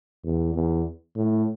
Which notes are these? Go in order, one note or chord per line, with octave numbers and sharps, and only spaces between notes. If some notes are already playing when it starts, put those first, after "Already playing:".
E2
E2
A2